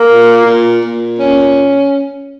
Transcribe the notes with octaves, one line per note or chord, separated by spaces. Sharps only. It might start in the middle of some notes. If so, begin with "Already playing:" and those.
Already playing: A#3
A#2
A#2
A#2
C#4